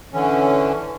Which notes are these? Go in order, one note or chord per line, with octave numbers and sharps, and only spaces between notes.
D3 E3 C#4